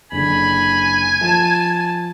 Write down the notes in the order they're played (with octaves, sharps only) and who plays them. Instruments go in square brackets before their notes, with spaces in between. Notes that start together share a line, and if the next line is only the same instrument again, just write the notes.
[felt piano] F#1 D3 [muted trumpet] G#5 [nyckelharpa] B5
[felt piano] F3 [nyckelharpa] A5